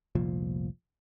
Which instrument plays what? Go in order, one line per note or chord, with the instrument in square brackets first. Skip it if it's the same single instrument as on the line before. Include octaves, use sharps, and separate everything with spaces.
[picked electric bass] F1 C2 A#2 F3